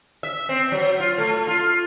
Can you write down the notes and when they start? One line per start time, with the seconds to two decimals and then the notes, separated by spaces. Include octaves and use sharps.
0.23 E5
0.49 C4
0.72 F#3
1.00 F4
1.18 A3
1.47 F4